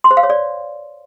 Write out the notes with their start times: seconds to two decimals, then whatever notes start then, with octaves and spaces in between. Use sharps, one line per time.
0.04 C6
0.11 C5
0.17 F5
0.23 C#5
0.30 D5